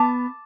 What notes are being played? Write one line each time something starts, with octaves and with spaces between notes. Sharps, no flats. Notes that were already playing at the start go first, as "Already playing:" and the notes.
Already playing: B3 A5 D6